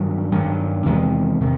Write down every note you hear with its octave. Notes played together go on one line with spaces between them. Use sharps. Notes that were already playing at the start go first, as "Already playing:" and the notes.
Already playing: G2 D#3 F#3
G2 D#3 F#3
E2 C3 D#3 G#3
C3 D#3